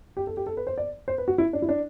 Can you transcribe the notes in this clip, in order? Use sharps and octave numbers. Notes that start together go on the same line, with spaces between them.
G4
A4
G4
A4
B4
C5
D5
C5
B4
F#4
E4
D4
E4
D4